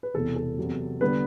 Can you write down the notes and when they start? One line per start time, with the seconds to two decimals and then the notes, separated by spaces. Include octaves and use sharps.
0.03 B4
0.14 E1 E2 C3 E3 A4
0.36 A4
0.58 E2 C3 F#3
1.01 D3 G3 B3 D4 B4